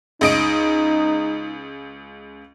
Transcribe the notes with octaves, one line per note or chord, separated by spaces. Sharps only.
C#2 D#4 D#5 D7